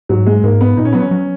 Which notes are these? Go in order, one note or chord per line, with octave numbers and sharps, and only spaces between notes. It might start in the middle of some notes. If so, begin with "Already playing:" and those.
G#2 F#3
G#3
G#2 A#3
B3
A#2 D#4
C#4
F#3 B3
C#4
F#3